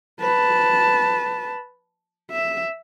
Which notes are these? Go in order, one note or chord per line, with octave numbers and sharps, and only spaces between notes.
B4 A5
E5